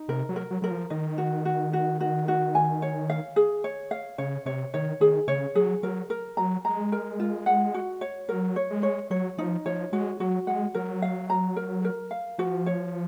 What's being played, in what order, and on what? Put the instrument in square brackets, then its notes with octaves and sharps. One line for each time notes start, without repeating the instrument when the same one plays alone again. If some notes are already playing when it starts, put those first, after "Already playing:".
Already playing: [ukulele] D#4
[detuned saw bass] C3 [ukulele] A#4
[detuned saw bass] F#3
[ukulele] A#4
[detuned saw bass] F#3
[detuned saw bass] F#3 [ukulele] A#4
[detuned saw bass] F3
[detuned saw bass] D#3 [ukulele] D#5
[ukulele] F#4
F#4
F#4
F#4
F#4
G#5
C#5
F5
G#4
C#5
F5
[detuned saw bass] C#3 [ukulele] C#5
[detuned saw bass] C3 [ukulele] C#5
[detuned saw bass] D#3 [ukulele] C#5
[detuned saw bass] D#3 [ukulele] G#4
[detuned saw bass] C#3 [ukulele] C#5
[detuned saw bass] F#3 [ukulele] G#4
[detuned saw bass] F#3 [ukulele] A#4
[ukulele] A#4
[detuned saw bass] F#3 [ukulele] A#5
[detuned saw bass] G#3 [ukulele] A#5
[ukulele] A#4
F4
F#5
F#4
C#5
[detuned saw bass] F#3 [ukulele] A#4
[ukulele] C#5
[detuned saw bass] G#3
[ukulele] C#5
[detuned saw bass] F#3 [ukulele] C#5
[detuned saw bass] F3 [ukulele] D#4
[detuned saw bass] F3 [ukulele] C#5
[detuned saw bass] G#3 [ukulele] F#4
[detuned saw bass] F#3 [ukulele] F#4
[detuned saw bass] G#3 [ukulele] F#5
[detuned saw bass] F#3 [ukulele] A#4
[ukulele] F5
A#5
A#4
A#4
F5
[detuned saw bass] F3 [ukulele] F#4
[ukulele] C#5